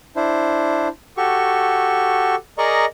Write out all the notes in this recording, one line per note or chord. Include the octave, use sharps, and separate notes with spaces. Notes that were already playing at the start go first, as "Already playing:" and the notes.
D4 E4 C5
F#4 G4 A4 C#6
G#4 A#4 D5 D#5 A#5 C#6